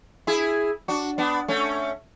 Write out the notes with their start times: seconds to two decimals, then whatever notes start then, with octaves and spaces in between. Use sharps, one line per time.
0.27 E4 G#4
0.88 D4 F#4
1.18 B3 D4
1.48 A3 C#4